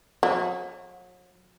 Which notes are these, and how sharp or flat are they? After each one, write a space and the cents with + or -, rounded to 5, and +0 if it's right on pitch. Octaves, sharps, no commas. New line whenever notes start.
F#3 -40